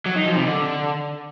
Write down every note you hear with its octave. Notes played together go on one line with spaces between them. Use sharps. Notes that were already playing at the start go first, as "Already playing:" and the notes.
F#3
D#4
F3
C3
D3